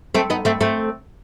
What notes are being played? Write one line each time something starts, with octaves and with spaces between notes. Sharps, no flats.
A3 C4
B3 D#4
A3 C4
A3 C4